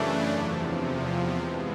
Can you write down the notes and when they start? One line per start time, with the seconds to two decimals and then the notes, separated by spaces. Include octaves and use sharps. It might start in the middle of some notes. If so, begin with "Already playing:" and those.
Already playing: F#2 C#3 E3 A3 D4
0.29 E2 C3 F3
1.38 G2 E3 G#3 B3